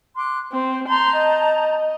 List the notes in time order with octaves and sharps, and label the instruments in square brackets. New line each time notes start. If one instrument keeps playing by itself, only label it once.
[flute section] C6 D6 F#6
[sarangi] C4 [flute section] C5
[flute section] A5 A#5 G6 [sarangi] C6
[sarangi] D#5